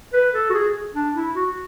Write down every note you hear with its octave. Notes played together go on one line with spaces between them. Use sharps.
B4
A4
F#4
G#4
D4
E4
F#4